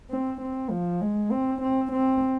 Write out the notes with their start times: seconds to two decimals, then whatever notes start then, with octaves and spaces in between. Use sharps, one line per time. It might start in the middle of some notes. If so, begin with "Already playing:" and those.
0.11 C4
0.42 C4
0.71 F3
1.01 G#3
1.32 C4
1.62 C4
1.92 C4